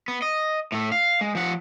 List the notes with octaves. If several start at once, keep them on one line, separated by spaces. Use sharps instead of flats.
B3
D#5
A2 A3
F5
G#3
F3 F#5